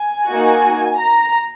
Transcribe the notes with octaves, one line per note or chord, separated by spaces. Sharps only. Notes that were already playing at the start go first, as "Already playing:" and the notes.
Already playing: G#5
A#3 D#4 F#4
A#5